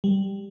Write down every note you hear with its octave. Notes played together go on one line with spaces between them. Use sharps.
G3